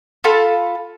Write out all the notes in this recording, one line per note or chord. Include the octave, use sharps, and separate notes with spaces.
F4 A4 A5 B5